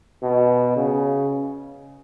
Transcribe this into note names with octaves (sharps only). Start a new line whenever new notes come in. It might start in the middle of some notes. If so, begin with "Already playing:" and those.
B2
C#3